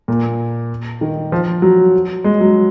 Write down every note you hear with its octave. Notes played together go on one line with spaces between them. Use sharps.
A#2
D#3
F3
F#3
G#3
F#3